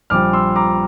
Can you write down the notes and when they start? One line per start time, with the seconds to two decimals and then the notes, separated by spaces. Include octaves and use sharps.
0.10 A#1 A#2 G3 D6 F6
0.33 C6 E6
0.56 A#5 D6